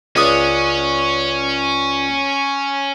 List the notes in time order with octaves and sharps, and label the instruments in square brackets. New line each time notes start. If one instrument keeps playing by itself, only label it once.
[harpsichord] C#2 D4 D#6 [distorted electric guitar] C#4